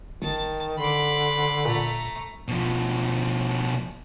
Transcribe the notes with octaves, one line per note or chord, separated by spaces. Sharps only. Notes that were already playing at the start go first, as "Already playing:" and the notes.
G1 D#3 A5
D3 B5 C6 D6
A#2 A3 A#5
B2 F3